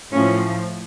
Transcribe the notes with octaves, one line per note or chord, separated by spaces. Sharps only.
A2 F3 C#4